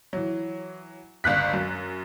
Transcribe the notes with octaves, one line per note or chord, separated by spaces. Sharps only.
E3 F#3
G1 C#2 F#6 B6
F#2